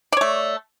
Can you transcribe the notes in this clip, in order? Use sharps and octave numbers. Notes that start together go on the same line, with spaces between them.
A3 C#5 D5